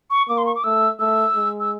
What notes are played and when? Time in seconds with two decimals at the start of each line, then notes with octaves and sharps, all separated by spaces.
0.10 C#6
0.29 A#3 D6
0.38 C6
0.46 C#6
0.56 D6
0.64 A3 E6
0.99 A3 E6
1.35 G#3
1.60 E6